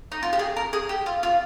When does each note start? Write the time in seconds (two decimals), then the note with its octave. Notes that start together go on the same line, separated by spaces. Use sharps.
0.12 D#4
0.23 F4
0.33 G4
0.39 G#4
0.56 A#4
0.73 G#4
0.89 G4
1.06 F4
1.23 F4